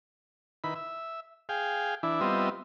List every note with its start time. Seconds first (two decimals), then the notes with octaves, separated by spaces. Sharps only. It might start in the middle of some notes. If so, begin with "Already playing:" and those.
0.64 D#3 E4 B4 B5
0.75 E5
1.49 G#4 F5 G5
2.03 E3 D4 E4
2.21 G3 B3 C4 F4 D#5 E5